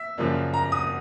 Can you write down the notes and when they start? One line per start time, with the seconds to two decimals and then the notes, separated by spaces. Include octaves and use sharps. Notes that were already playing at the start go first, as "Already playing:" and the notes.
Already playing: E5
0.18 F#2 C#3 F3 A#3 D4
0.54 A#5
0.72 D#6